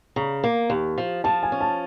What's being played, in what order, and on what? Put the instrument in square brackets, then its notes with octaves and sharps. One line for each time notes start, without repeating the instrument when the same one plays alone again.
[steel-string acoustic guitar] C#3 [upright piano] A#5
[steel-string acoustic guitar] A#3
D#2
F3
[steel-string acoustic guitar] F3 [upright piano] A5
[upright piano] G#5
[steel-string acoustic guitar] C#4
[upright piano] A5